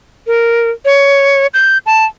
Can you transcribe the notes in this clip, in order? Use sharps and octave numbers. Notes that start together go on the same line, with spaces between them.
A#4
C#5
G6
A5